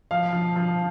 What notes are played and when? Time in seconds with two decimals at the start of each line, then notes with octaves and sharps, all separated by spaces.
0.11 F3 F5
0.33 F3
0.56 F3